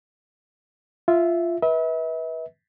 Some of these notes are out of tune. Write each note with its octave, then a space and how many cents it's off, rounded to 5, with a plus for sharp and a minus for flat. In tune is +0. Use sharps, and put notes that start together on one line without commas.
F4 -10 E5 +0
B4 -20 E5 -40